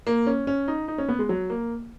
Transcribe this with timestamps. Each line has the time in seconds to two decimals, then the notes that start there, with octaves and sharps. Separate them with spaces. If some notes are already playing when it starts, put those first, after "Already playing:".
0.07 A#3
0.27 C#4
0.47 C#4
0.68 D#4
0.88 D#4
0.98 C#4
1.09 B3
1.19 G#3
1.29 F#3
1.50 A#3